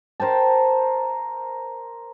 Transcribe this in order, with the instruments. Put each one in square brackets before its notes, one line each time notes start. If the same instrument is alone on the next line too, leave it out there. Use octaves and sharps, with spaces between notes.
[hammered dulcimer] A#4 C5 G5 A5